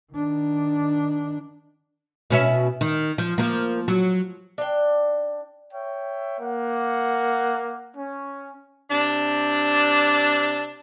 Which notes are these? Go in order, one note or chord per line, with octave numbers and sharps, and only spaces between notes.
D#3 D4
B2 C#4 E4
D#3
F3
F3 A#3
F#3
D4 G5
C#5 E5 G5
A#3 F#5
C#4
C3 D4